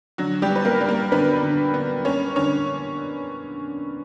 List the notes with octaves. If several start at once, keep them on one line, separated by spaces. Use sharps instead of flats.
D3 F#3 F#4
G3 G4
B3
B4
A#3 A#4
G3
A#3 A#4
D3 B3 B4
D3
B3
A#3 C#4 C#5
D3 C#4 C#5